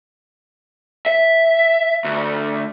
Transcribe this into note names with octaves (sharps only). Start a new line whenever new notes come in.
E5
D2